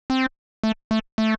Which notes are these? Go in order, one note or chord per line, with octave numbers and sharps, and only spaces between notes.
C4
A3
A3
A3